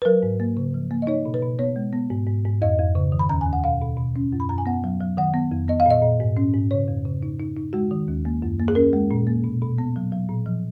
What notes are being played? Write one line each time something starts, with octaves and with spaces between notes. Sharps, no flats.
B4
F#3 A#4
G#2
A#3
C#3
F3
A#3
D#5
D#4 C#5
B2
B4
B2
B3 C#5
G#3
B3
G#2
G#2
G#2
F2 D#5
F2
C#3
D#3
B5
D#2 A#5
G#5
D#2
F#5
B2 F5
B2
B2
C#4
F#2
B5
F#2 A#5
G#5
B3 F#5
F#3
F#3
D#3 F#5
B3
F2
B3 D#5
F5
A#2 D#5
A#2
G#2
C#4
G#2
C#3 C#5
F2
C#3
D#4
D#4
D#4
G#3 F#4
D#3
D#2
A#3
F#2
A#3
G#4
C#4 A#4
G#3
A#2
A#3
B2
B2
B3
F#3
F#3
A#2
F3